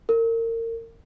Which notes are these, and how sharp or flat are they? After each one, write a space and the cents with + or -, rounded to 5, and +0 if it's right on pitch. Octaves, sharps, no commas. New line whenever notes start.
A#4 -30